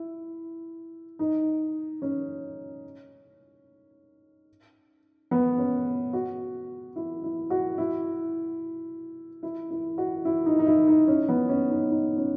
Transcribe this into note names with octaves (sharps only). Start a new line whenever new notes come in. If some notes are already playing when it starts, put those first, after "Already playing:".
Already playing: E4
D#4
C#4
B3
C#4
F#4
E4
E4
F#4
E4
E4
E4
F#4
E4
D#4
D#4
E4
D#4
C#4
B3
C#4
D#4
D#4
C#4